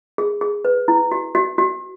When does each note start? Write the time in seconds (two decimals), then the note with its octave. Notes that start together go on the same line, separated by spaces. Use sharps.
0.18 G#4
0.41 G#4
0.65 B4
0.88 E4
1.12 F#4
1.35 F#4
1.58 F#4